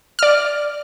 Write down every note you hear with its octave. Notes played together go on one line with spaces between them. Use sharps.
D5 F6